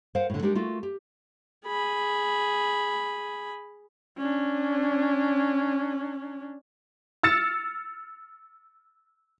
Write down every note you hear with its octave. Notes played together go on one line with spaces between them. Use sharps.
A#4 C5 F5 F#5
A2 D3
G#3 D4 D#4 G4 A#4
A3 F4 F#4 A#4
G4
G#4 B5
C#4 D4
E6 F6 A6 C#7 E7